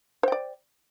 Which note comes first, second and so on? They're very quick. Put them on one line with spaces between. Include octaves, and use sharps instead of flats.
C5 G5 D5